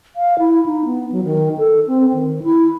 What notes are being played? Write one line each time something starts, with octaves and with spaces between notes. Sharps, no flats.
F5
E4
D#4
B3
F#3
D#3
A4
C4
D#3
E4